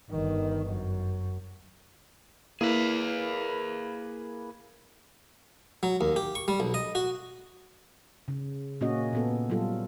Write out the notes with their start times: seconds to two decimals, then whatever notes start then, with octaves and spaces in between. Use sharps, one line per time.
0.10 G1 D#3
0.70 F#2
2.61 A#3 E4 G#4 A#4 B4
5.83 F#3
6.01 D#2
6.16 G4
6.35 C#6
6.48 G3
6.60 B1
6.74 D#5
6.95 F#4
8.28 C#3
8.81 A#2 A#3 C#4 F#4 D#5
9.13 A#2 B3 A4
9.50 F#3 G3 F4 A4